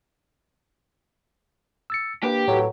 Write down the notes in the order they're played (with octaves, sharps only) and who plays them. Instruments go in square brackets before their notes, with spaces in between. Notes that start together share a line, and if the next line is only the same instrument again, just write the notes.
[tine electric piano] E6 A6 C#7
[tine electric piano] A#3 D4 B4 [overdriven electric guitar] G4
[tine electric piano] A2 A4 B4 [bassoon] F#3